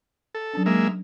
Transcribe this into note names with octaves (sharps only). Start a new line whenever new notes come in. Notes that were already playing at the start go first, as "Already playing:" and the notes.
A4
F#3 C#4 D4
G#3 A#3 E5